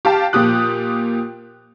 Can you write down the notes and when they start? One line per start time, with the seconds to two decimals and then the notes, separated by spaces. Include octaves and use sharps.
0.05 G4 F5 A5
0.33 A#2 F3 G4 D#6 F#6